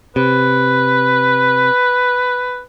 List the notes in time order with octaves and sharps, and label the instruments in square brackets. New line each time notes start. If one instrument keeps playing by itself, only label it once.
[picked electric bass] C3 [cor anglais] B4